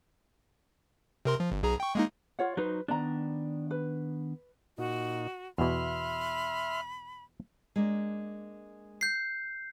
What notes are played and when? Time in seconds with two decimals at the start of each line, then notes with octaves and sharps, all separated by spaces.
1.25 C3 A#4 C6
1.40 F3
1.52 G1
1.63 B1 G#4 A#5
1.80 G5 C#6
1.95 G#3 A#3 D#4
2.39 F4 C#5 F#5
2.57 F#3 D#4 B4 C5
2.88 D#3 B3 D4 D5 A#5
3.71 B4
4.78 A#2 D#4 F#4
5.58 E2 B2 E5 B5 C6 F6
7.76 G#3 A#3 D4
9.01 G6 C7